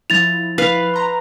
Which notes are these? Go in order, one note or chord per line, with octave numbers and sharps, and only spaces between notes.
F3 E4 A6 F7
B4 F5
A#5 C6